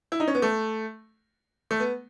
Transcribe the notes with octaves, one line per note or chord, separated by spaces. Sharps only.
E4
D#4
C#4
B3
A3
A3
B3